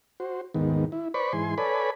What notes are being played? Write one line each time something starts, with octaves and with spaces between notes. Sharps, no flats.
F#4 C5
D#2 G#2 D#3 B3
E4
B4 C5 D5 B5 C#6
G#2 E3 G#5 C6
A4 B4 C#5 D5 G#5 B5